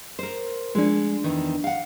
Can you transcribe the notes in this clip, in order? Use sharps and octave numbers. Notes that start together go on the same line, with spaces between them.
A#4 C5
F3 G#3 D4
E2 D#3
F5 F#5